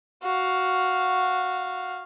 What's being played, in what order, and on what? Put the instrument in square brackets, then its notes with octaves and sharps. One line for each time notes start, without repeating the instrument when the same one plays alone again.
[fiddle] F#4 F5